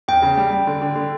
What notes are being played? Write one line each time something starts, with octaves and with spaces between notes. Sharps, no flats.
E2 G5
C#3
G3
G3
D3
D3
D3